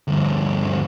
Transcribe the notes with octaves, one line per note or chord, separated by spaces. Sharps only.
D2 G2